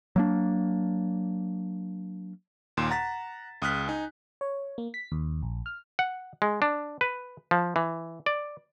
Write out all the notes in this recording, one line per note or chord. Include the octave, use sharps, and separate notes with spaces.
F#3 A#3 D4
D#2 A#2 C6 E7
F#5 A#5 A6 B6
C#2 D#6 F6 F#6 B6
D#4 G#5
C#5
A#3
B6
D#2
A#1
F6
F#5
G#3
D4
B4
F3
E3
D5